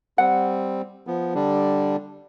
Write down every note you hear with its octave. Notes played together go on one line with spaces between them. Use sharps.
G3 C4 F#5
F3 B3
D3 G3 D4